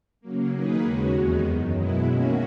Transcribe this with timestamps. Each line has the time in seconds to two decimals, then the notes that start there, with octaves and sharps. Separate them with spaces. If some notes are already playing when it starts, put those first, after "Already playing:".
0.21 C#3 F#3 A#3
0.52 D#3 A#3 D#4 G#4 B4
0.82 D#2 C#3 G#3 C#4 F#4
1.13 E2 D#3 G#3 B3 D#4
1.43 F#2 D#3 F#3
1.75 B2 G#3 B3 E4
2.06 D#3 A#3 C#4 F#4